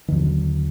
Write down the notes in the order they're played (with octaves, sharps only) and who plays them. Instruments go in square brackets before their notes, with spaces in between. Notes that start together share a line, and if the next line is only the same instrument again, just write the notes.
[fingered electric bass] D#3
D#2 D3 F#3